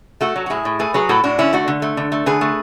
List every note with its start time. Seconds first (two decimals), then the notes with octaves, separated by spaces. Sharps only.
0.21 A3 F#4 A4
0.36 F#3
0.46 F#4
0.50 A2 E4 G#4
0.65 A2
0.79 A3 G#4 B4
0.94 F#3 G#4 B4
1.09 A2 F#4 A4
1.24 A2 D4 F#4
1.39 D3 C#4 E4
1.53 A3 D4 F#4
1.68 D3
1.82 A3
1.97 D3
2.12 A3
2.26 D3 G#4 B4
2.41 A3